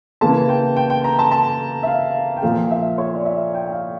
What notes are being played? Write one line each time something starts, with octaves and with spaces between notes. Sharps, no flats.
C#3 E3 A#3 A5
G5
G5
G5
A#5
A5
A5
E5
F5
G5
A#2 F3 A#3 F5
E5
C#5
D5
E5
G5
G5
F5